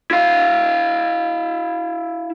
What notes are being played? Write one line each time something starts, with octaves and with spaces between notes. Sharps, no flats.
E4 F5